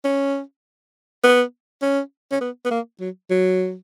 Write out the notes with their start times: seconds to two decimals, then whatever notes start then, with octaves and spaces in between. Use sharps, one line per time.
0.04 C#4
1.24 B3
1.82 C#4
2.32 C#4
2.41 B3
2.65 B3
2.71 A#3
3.00 F#3
3.30 F#3